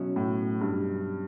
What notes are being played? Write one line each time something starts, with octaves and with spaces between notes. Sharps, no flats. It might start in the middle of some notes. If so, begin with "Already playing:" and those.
Already playing: B2 F#3 C#4 E4
A2
G2